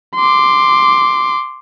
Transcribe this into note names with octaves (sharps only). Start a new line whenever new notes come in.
C6 D6